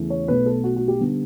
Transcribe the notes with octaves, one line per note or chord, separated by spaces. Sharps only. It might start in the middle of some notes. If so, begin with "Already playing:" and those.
Already playing: E2 C#3 E3 A3
C#5
B1 B2 A3 B4
A4
F#4
F#4
G4
D3 G3 B3